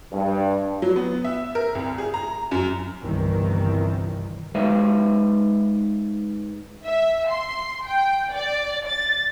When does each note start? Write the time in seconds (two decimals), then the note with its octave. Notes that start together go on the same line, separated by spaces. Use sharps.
0.11 G2
0.82 F#3
0.96 B3
1.24 E5
1.55 A#4
1.75 C2
1.98 G#4
2.14 A#5
2.51 F#2
3.00 G1 C2 D#3 E3
4.55 G#2 G#3 B4 E5 F5
6.85 E5
7.29 C6
7.87 G5
8.34 D5
8.87 A6